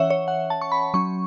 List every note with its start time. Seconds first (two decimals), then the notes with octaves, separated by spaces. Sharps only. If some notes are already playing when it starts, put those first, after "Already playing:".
Already playing: E3 C#4 C#5 E5 F#5
0.10 C#5
0.28 F#5
0.50 A5
0.61 C#6
0.72 B5
0.94 F#3 C#4 C#6